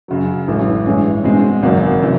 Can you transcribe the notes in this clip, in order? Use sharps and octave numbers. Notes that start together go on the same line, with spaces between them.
F#2 C#3 F#3
A1 A2 E3 G#3 C#4
G2 E3 G#3 C#4
B2 G#3 C4
G#1 F#2 C#3 F#3 A#3
C3 E3